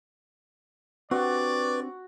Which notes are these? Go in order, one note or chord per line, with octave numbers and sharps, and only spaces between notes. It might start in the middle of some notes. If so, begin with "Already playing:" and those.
C4 D4 F#4 G4 B4 D5 C#6